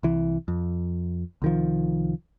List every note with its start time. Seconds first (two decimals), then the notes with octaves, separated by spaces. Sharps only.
0.03 C2 E3
0.48 F2
1.42 C2 D#3 F3